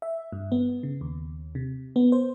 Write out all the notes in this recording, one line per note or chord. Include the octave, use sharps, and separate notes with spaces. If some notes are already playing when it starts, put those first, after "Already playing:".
E5
G2
B3
C#3
D#2
C3
B3
C5